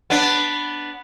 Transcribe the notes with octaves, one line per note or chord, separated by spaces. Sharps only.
B3 D4